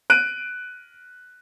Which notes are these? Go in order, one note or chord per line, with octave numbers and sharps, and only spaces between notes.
F#6 D7 D#7